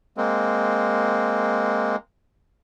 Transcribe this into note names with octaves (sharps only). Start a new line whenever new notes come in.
G#3 A#3 C4